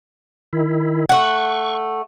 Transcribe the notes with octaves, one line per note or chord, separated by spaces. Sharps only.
D#3 E4
A3 F#5 C#6